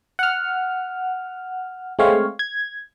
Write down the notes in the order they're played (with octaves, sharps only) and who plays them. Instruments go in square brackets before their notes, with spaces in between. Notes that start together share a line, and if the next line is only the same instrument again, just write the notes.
[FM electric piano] F#5 F6
G#3 A3 C4 C#5 F5
G#6